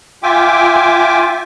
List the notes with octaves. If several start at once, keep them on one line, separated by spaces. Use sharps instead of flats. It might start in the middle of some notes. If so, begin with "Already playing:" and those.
F4 E5 G5 G#5 D6